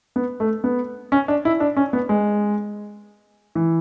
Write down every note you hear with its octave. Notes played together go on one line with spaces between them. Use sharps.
B3
A3
B3
C#4
D4
E4
D4
C#4
B3
G#3
E3